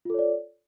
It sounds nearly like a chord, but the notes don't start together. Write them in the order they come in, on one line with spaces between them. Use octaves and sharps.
F4 A4 C#5 D5